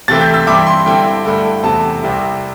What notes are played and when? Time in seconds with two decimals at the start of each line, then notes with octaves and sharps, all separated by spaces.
0.08 C3 E3 A3 C4 E4 A6
0.21 G6
0.34 E6
0.47 G2 E3 C4 E4 D6
0.67 C6
0.86 G2 D3 C4 E4 G5
1.25 G2 D3 A3 E4
1.63 E2 C3 A3 A5
2.02 C2 C3 G3 C4 E4